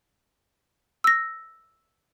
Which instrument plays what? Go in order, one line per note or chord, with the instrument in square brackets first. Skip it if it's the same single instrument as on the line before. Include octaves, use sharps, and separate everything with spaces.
[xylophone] E6 A#6